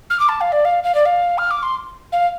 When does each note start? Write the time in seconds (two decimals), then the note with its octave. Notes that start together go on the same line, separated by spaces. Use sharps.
0.10 F6
0.19 D6
0.29 A5
0.41 F5
0.52 D5
0.65 F5
0.84 F5
0.95 D5
1.05 F5
1.38 F6
1.51 D6
1.63 C6
2.12 F5